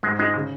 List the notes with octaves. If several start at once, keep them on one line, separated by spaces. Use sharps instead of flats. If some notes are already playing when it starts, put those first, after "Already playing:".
G#2 G#3
G#3 D#4
C#3